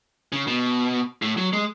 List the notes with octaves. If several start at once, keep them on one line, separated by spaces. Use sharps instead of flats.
C#3
B2
A2
F#3
G#3